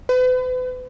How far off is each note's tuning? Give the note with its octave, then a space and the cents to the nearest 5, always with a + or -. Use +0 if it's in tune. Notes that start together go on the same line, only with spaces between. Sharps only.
B4 +40